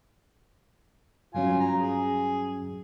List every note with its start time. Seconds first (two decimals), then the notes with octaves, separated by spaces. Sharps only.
1.34 G2 F#3 C#4 F4 G#5
1.60 A#5
1.79 G#4